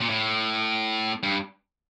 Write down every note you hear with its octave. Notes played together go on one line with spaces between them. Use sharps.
A#2
A2
G2